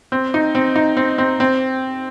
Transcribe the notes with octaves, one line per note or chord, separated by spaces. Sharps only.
C4
D#4
C4
D#4
C4
C4
C4